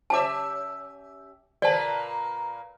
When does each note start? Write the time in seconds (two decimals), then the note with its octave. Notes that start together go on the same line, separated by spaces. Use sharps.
0.10 C#4 G4 E5 A5 D6
1.62 A#2 A#3 B4 D5 A5